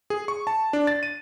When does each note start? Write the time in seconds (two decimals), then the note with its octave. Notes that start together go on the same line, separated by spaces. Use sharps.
0.10 G#4
0.28 C#6
0.47 A5
0.73 D4
0.87 A6
1.03 D#7